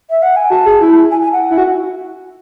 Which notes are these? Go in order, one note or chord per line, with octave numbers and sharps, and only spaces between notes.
E5
F#5
G#5
F#4 A5
G#4
E4
G#5
G#5
F#5
E4
F#4